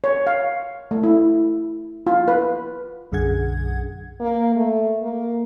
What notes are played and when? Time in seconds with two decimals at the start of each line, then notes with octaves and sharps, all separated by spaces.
0.04 C#5
0.27 F5
0.91 A3
1.03 E4
2.07 F4
2.28 B4
3.12 B1 F#2 D3 G#4 F#5 G#6
4.20 A#3
4.55 A3
5.02 A#3